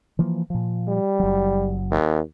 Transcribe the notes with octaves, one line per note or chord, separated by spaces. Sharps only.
E3 F3 A#3
A#2 F3
G3
F#1 F#3
D#2